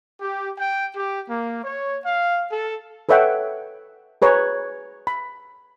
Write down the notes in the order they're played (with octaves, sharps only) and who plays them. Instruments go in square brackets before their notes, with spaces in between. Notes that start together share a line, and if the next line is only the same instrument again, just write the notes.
[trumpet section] G4
G5
G4
A#3
C#5
F5
A4
[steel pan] A4 B4 C#5 E5 F#5 G5
G#4 B4 C#5 A#5
B5